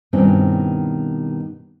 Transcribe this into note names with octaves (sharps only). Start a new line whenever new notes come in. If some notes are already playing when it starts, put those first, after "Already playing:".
G2 B2 D#3 C4 C#4 E4